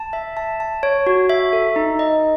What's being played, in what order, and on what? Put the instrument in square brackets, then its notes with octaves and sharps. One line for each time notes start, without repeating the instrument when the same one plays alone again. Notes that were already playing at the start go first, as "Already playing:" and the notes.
Already playing: [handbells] A5
E5
A5
A5
C#5
F#4
E5
A4
D#4
D#5